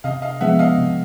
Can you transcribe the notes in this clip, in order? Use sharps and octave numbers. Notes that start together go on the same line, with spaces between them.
C3 D#5 F5
D#5 F5
F3 G#3 B3 E5 F#5
D#5 F5
C3